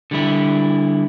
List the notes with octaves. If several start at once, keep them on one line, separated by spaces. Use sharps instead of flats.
D3 G3 E4